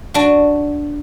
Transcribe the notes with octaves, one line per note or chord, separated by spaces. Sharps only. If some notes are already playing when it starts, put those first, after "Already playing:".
D4 F#4